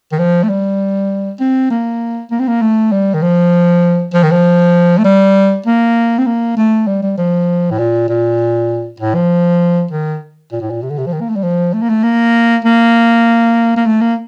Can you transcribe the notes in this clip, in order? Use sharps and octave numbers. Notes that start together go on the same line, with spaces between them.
D#3
F3
A3
G3
C4
A#3
A#3
C4
A#3
A3
G3
D#3
F3
F3
D#3
F3
A3
G3
A#3
C4
A#3
A3
G3
G3
F3
A2
A#2
A#2
A2
F3
D#3
A#2
A2
A#2
C3
D3
C3
F3
D#3
A#3
A3
G3
F3
A3
A#3
A3
A#3
A#3
A#3
A3
A#3